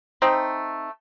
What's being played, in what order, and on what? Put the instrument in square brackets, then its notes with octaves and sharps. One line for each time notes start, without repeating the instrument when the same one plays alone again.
[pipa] A3 C4 D#4